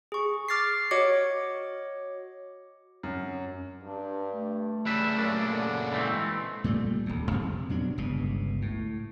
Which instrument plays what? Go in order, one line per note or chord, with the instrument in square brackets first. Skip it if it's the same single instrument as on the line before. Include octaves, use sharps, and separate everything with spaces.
[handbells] G#4 C#6
D6 F6 A6 A#6 C7
F#4 C#5 D#5 D6 C#7
[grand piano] F#2
[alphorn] G2 [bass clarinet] D4
[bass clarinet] A3
[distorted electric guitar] C#3 G3 [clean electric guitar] B4 E5
[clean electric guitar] F#2 D4 [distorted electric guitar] A#2 C#3 [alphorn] A#4
[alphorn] D3
[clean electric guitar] E3 A3 C4 [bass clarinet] G#3
[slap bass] A#2 G3 A3
D#1 D2
F2 C3
B2 F#3 D4
G1 C#2 B2
A2